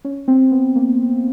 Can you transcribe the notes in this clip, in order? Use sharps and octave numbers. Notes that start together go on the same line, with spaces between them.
C#4
C4
B3
A#3